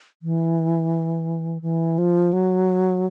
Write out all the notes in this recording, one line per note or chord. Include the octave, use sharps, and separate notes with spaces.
E3
E3
F3
F#3